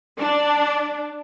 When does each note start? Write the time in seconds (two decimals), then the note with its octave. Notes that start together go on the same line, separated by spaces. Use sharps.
0.18 D4